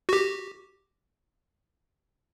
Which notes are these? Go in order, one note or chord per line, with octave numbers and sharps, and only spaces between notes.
F#4 G4